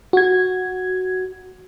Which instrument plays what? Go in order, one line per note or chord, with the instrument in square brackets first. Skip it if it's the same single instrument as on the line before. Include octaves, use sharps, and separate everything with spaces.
[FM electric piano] F#4 G#6